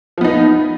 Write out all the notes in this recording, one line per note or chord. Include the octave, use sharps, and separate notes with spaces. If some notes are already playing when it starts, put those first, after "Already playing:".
F3 B3 D#4